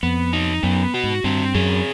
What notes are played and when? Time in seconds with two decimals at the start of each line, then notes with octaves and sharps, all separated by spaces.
0.03 F2 B3
0.33 D#4
0.63 F#2 B3
0.94 F#4
1.04 G#2
1.24 G2 C4
1.55 F#2 G#4